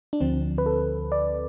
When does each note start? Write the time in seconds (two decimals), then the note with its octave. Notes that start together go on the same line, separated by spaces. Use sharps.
0.13 D4
0.20 D2 D3 F3 C4
0.58 B4
0.66 A4
1.12 D5